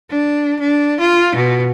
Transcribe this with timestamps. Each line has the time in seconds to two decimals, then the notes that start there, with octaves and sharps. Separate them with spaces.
0.11 D4
0.59 D4
1.00 F4
1.35 B2